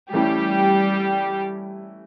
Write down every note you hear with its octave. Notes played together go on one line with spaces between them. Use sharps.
E3 G3 A3 C#4 E4 G4